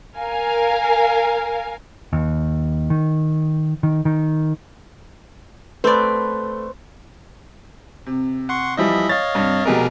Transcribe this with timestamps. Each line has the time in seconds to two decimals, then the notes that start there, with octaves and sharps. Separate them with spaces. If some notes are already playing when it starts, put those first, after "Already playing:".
0.17 A#4 F5 G#5
2.13 D#2
2.90 D#3
3.83 D#3
4.05 D#3
5.84 A3 C4 B4 D5
8.06 C3
8.49 F#5 C6 C#6
8.77 E3 F3 G3 D#5 E5 B5
9.09 C#5 D#5 F5 A6
9.35 G2 C3
9.65 F1 B2 G4 G#4 A#4 D#5